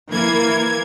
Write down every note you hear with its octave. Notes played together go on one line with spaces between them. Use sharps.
E3 A#3 G#6